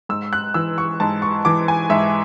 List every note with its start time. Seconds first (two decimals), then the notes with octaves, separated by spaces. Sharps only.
0.09 G#2 E6
0.33 F#6
0.54 E3 E6
0.78 C#6
1.00 G#2 A5
1.22 C#6
1.45 E3 D6
1.68 G#5
1.90 G#2 E5